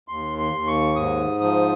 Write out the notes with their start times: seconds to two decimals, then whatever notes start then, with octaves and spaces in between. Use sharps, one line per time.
0.08 D#2 C6
0.38 C6
0.53 D#2
0.67 C#6
0.96 G#2 D#6
1.41 F3 D#6